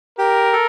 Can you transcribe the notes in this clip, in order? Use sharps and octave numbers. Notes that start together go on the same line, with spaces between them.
G4 A#4
A4